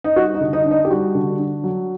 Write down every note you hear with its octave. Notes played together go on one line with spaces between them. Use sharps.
D#4
G3 F#4
D#4
D3
D#4
D4
D#4
G4
G3 F#4
D3
D4
F#3